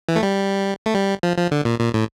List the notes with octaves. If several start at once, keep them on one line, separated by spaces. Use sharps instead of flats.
E3
A3
G3
A3
G3
F3
F3
D3
A#2
A#2
A2